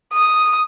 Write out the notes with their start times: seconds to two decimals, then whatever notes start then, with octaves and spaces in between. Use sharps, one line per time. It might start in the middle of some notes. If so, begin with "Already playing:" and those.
0.13 D#6